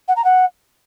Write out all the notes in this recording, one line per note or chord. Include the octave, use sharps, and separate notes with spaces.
F#5
A#5
F#5